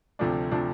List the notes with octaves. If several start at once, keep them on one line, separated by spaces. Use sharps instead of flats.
D2 C3 F3 A3 D4
C3 F3 A3 D4